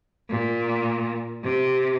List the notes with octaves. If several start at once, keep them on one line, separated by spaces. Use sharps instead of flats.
A#2
C3